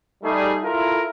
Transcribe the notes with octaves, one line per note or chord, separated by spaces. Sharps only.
G3 A3 D#4 G#4
E4 F4 A4 A#4